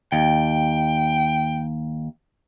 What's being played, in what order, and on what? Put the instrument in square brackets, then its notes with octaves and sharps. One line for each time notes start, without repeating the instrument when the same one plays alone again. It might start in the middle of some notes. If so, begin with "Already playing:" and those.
[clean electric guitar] D#2 [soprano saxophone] G5